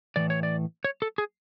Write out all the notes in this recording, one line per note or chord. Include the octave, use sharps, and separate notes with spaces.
A2 E3 D5
C#5
D5
C#5
A4
G#4